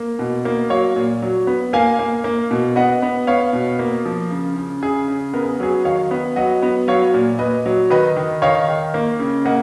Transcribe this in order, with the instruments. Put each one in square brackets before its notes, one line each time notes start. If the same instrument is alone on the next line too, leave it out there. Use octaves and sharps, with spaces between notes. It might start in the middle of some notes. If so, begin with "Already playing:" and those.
Already playing: [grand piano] A#3
B2
A#3
F#3 C#5 F5
A#2
F#3
B3
A#3 F5 G#5
A#3
A#3
B2
B3 D#5 F#5
B3
B3 C#5 F5
B2
A#3
F3
C#3
C#3
C#3 G#4
C#3
B3 A#4
G#4
F#3 G#4
D#3 C#5 F5
B3
F#3 D#5 F#5
B3
F#3 C#5 F5
A#2
A#2 B4 D#5
F#3
D#3 B4 D#5
D#3
D#3 C#5 F5
D#3
A#3
C#3
A#3 D#5 F#5